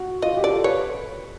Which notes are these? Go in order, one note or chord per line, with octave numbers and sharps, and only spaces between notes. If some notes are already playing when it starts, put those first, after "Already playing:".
Already playing: F#4
F4 D#5
G4
D5
A4
B4 C#5